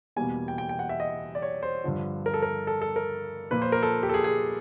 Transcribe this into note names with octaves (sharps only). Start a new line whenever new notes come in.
E2 B2 G3 A#3 G#5
G5
G5
G5
F#5
E5
D#5
D5
C#5
C5
G2 D3 F3
A#4
A4
A#4
A4
A4
A#4
A#2 F3 A#3 B4
C5
A#4
A4
G4
A4
G#4
G#4